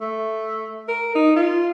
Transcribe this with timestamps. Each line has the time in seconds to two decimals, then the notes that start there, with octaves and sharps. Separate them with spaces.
0.01 A3
0.88 A#4
1.15 D#4
1.36 F4